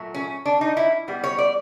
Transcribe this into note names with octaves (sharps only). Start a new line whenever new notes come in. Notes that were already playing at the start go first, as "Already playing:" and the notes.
Already playing: A#2 F#3 A3
C#4
D4
D#4
E4
E3 G3 B3
C#5
D5